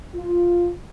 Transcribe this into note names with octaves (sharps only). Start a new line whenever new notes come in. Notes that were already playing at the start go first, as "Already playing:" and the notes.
F4